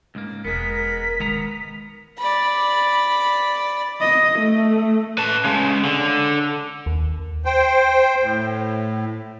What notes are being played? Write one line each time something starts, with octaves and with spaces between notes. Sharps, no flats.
C#2 G#2 A#3
E1 G#3 B3 D#4 A#4 B6
D#3 G#3 B3 A#5
D5 B5
D#5
A3
B4 A5
C#3 G#3
D3
D#2
C5 G5
A2